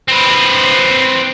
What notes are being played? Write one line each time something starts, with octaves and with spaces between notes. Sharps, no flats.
C4 B4